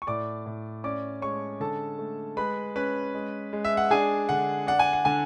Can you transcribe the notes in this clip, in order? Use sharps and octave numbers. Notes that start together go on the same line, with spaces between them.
C#6
A2 D5 D6
A2
C#4 D5 D6
G#3 C#5 C#6
D3 A4 A5
A3
G#3 B4 B5
C#4 B4 B5
G#3
G#3
E5
F#5
D4 G#4 G#5
D3 F#5
D4 F#5
G#5
F#5
D3 G#5